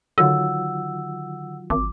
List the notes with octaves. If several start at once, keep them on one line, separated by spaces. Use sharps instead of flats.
D3 D#3 F#3 F4 F#5 E6
G#1 D6